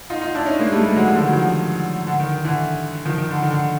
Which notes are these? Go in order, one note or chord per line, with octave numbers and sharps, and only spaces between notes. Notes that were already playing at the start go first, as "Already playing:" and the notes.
D#4 F4
D#4 F4
D4 E4
C#4 D#4
G#3 A#3
G3 A3
G3 A3
F#3 G#3
F3 G3
D3
D#3
F#3
D#3 F3
D3
D#3
D#3
D3 E3
D#3 F3
D#3
D3
D#3
D3